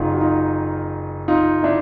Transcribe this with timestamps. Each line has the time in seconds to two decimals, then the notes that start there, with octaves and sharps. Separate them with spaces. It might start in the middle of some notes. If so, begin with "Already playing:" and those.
Already playing: F#1 D#4 F4
0.13 F#4
0.21 D#4 F4
1.28 D#4 F4
1.63 D4 E4